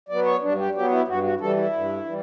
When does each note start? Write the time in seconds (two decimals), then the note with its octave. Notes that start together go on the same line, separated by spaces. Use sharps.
0.09 F#3 B3 D5
0.26 C#5
0.42 G2 D4
0.58 G4
0.75 F#3 B3 G4
0.91 E4
1.07 G2 F#4
1.23 F#4
1.40 E3 G3 A4
1.56 E4
1.73 G2
2.06 E3 G3